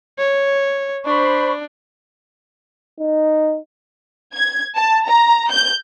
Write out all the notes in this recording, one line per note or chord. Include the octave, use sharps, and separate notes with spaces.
C#5
D4 C5 B5 C#6
D#4
G#6
A5
A#5
G6